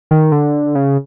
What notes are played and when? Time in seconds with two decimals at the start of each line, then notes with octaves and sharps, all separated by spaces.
0.11 D#3
0.32 D3
0.75 C#3